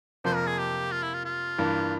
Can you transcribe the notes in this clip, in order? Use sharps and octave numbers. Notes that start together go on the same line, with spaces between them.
F2 C3 F3 A#3 C5
A#4
G#4
G4
F4
E4
F4
F4
G2 E3 A#3